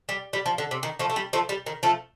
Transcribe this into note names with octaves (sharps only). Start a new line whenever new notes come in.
G3
G3
F3
D3
C3
D#3
F3 A3
A3
G3
F3 A3
G3
D#3
F3 A3